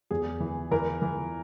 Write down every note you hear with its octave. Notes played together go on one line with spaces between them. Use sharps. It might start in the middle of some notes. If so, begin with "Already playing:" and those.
E2 G#4
E3
E3 A#4
E3